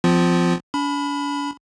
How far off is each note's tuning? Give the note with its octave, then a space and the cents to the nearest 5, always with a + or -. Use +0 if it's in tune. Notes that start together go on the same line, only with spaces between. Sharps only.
F3 +0 C4 -40 F4 +0
D4 -45 B5 +0